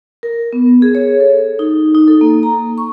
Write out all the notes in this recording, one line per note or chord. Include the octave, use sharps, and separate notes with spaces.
A#4
B3
G#4
C#5
A4
D#4
D#4
A4
A#3
A#5
C#6